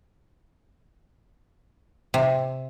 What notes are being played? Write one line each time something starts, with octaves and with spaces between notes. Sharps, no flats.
C3